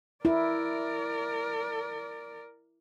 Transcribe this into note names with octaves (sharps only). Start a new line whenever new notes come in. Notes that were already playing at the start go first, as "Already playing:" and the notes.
E4 A#4 D5